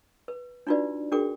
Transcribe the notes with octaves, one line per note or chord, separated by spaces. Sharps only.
B4
D4 D#4 F4 F#4 B4 D5
D4 F#4 G#4 A#4 G5 D6